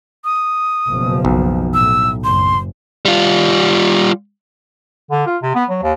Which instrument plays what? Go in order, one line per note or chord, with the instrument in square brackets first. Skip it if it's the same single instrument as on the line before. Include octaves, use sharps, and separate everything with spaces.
[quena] D#6
[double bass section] F#1 B2 F3
[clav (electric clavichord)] B1
[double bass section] A2 [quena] E6
[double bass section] F#1 [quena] C6
[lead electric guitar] G3 F4
[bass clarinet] D3
F4
C3
B3
F#3
D#2